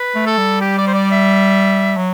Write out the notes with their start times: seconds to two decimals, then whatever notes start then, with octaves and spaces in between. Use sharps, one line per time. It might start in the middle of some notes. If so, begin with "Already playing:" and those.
Already playing: B4
0.15 A3
0.26 A4
0.38 G3
0.61 G4
0.78 D5
0.87 C5
0.94 D5
1.11 E5
1.97 F#3